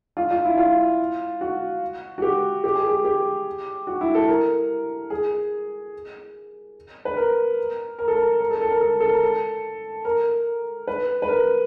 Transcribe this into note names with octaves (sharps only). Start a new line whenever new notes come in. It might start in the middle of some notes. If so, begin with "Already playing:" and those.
F4
F4
E4
F4
F#4
F#4
G4
G4
G#4
G4
G4
F#4
E4
A4
A#4
G#4
B4
A#4
A#4
A4
A#4
A#4
A4
A4
A#4
A4
A4
A#4
A4
A#4
B4
B4
A#4